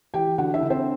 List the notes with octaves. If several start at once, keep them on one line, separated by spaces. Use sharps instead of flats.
E3 G4 G5
D3 F#4 F#5
E4 E5
D3
C4 C5